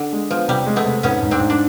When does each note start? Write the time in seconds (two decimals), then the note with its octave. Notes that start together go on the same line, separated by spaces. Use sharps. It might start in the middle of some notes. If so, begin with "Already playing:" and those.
Already playing: D3
0.13 G#3
0.30 F3 B3
0.48 C3 G3
0.66 G#3
0.76 A3 B3
0.86 C3
1.03 G#2 B3 C#4
1.23 G#2
1.31 C4 D4
1.40 G#2
1.50 D4